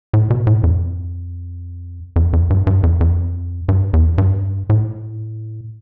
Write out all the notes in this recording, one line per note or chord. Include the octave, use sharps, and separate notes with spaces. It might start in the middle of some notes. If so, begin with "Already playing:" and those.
A2
B2
A2
F2
F2
F2
G2
G2
F2
F2
G2
E2
G2
A2